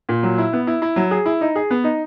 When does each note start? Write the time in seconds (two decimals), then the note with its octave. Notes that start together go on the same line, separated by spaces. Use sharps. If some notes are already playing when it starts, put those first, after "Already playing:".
0.09 A#2
0.23 F#3
0.38 E4
0.53 B3
0.67 E4
0.82 E4
0.96 F#3
1.11 G#4
1.26 E4
1.41 D#4
1.56 G#4
1.70 B3
1.84 D#4